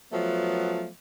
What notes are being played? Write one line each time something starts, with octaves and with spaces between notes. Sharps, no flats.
F3 F#3 A3 B3